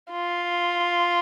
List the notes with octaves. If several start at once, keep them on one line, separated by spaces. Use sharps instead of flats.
F4